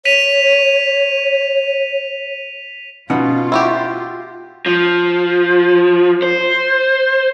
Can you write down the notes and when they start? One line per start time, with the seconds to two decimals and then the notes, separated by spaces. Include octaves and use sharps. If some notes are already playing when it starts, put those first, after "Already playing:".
0.05 C#5 B6 D#7 F7
3.10 B2 C#4 D#4 F4 F#5
3.52 E4 F#4 G4
4.66 F3
6.22 C5